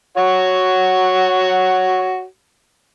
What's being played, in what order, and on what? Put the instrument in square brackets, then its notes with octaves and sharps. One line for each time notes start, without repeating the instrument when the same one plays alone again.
[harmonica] F#4 C#5 F#5